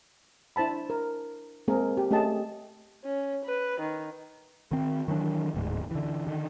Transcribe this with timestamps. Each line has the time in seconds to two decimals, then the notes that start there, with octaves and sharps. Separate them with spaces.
0.56 D4 E4 C5 A5 B5
0.90 A#4
1.68 G#3 A#3 C4 G#4 A#4
1.97 G4
2.11 A3 C#4 G4 G#4 D#5 A5
3.04 C#4
3.46 B4
3.81 D#3
4.71 D#3 C4
5.08 D#3 E3 F#3 D4
5.54 D1 D2 G#2
5.91 D3 E3
6.27 D3 D#3